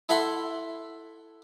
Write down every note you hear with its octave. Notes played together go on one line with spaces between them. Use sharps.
E4 A4 E5 F#5 B5 C6